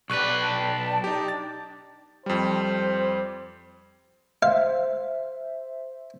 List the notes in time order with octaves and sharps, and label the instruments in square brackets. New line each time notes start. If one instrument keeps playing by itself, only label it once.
[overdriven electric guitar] B1 B4 [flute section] D4 G4 D5 [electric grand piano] C#6 F#6
[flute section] D5 G5 A5
[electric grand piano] D#4 G4
[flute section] D4 [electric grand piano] A6
[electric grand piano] F2 G3 [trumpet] C5
[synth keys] C5 E5 [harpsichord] F5